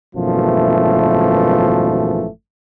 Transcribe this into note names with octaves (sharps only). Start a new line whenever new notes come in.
G#1 F#2 B2 E3 F3 A3